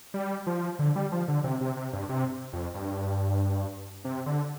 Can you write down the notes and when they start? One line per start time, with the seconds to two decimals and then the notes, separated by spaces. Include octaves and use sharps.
0.14 G3
0.46 F3
0.79 D3
0.96 G3
1.12 F3
1.28 D3
1.44 C3
1.61 C3
1.76 C3
1.93 G2
2.09 C3
2.53 F2
2.74 G2
4.05 C3
4.26 D3